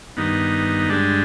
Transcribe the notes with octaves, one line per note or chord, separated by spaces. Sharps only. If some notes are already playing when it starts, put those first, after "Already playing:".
G2 D#3 B3 D#4
G2 D3 G#3 D4 G4